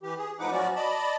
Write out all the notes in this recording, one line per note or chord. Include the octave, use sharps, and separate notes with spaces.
E3 G4
G#4
A2 F3 D#4 B4 F#5 D6
F3 F#3 B3 C#4 F#4 D5
D5 D#5 A5 B5